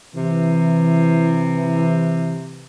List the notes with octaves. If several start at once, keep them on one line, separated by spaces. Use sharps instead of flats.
C3 E3